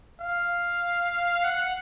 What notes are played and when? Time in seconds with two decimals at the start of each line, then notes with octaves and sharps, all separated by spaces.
0.20 F5
1.44 F#5